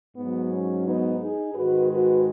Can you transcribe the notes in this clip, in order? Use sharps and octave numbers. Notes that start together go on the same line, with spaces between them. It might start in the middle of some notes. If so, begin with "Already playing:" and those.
G#2 F#3 B3
C#4
B3 D#4
D#4 G#4
G#2 D#3 G#3 F#4 B4
F#4 B4